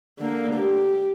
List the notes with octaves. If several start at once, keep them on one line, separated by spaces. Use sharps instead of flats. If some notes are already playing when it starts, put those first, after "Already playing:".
D3 A#3
G4